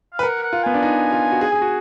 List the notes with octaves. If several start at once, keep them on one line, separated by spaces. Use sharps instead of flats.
F5
B4
A#4 F#5
F#5
F4
B3 G#5
D4
D#4
F4
F#4
G#4
G#4
F#4